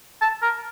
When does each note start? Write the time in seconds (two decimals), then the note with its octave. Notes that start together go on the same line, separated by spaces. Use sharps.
0.21 A5
0.42 A#4